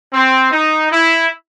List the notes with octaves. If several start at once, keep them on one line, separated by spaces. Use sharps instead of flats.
C4
D#4
E4